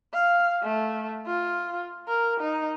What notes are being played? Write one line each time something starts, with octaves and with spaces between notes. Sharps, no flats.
F5
A3
F4
A#4
D#4